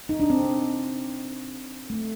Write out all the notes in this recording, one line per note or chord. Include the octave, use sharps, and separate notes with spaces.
D#4
D4
C4
A3